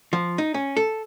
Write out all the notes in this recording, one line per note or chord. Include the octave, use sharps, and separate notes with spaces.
F3
D#4
C#4
A4